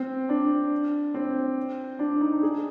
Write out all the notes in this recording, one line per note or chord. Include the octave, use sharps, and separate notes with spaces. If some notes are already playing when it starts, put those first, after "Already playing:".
Already playing: C4
D4
C4
D4
D#4
G#4